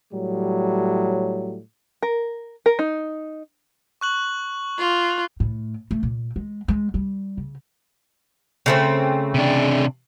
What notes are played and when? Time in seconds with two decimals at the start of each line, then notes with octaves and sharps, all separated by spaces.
0.13 A2 F#3 G3
2.03 A#4
2.66 A#4
2.79 D#4
4.01 C#6 F#6 F#7
4.78 F4
5.40 A2
5.91 A3
6.03 A#2
6.36 G#3
6.68 G#3
6.94 G3
7.37 C#3
8.66 C#3 A3 C4
9.34 C3 D4